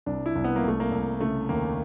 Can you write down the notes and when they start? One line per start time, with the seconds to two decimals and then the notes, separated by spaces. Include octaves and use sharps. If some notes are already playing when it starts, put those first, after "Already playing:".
0.06 C2 D4
0.26 E4
0.36 C2
0.44 B3
0.56 A#3
0.64 C2 A3
0.80 A#3
0.92 C2
1.20 C#3 A3
1.49 D#2 A#3